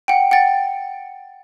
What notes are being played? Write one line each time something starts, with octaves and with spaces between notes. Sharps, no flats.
F#5 G5
F#5 G5 A6